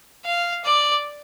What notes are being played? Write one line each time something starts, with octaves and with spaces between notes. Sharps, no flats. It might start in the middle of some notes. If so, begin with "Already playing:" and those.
F5
D5